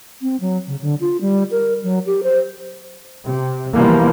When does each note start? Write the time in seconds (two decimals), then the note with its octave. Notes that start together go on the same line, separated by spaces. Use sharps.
0.22 C4
0.41 F#3
0.67 C#3
0.81 D3
1.01 F4
1.21 G3
1.51 A#4
1.84 F#3
2.06 G4
2.23 C5
3.25 C3
3.75 B2 E3 F3 G3 A#3